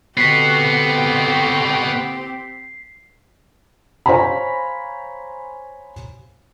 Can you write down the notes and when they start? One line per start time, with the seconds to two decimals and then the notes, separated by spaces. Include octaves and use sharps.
0.17 D3 B3 C4 F#4 G4 B6 C7
4.06 C5 C#5 F5 G#5 A#5 B5